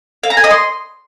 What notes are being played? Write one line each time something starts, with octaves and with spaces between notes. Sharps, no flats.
F5
A#5
G#5
D#5
C6